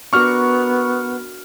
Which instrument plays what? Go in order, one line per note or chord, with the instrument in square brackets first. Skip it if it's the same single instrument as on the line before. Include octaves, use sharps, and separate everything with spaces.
[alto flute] B3 [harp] D4 F#4 A#4 [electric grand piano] C#6 F6